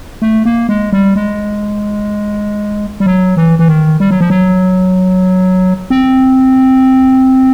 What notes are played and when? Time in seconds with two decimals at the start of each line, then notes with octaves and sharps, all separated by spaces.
0.22 A3
0.45 A#3
0.69 G#3
0.93 G3
1.16 G#3
3.00 G3
3.06 F#3
3.37 E3
3.59 E3
3.68 D#3
4.00 G3
4.11 F#3
4.21 F3
4.30 F#3
5.90 C4